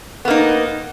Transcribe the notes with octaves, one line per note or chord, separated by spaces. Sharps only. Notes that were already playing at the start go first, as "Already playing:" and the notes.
A#3 B3 D#4